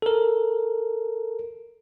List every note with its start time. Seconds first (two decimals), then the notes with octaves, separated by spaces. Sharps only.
0.02 A4 A#4